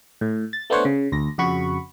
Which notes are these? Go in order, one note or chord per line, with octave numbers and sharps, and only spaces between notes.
A2
A6
A3 B3 D4 C5 C#5 F#5
C#3
D2 A#6
F2 C#3 F#4 B5 C#6